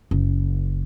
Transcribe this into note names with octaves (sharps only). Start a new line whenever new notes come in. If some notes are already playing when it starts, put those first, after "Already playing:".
F#1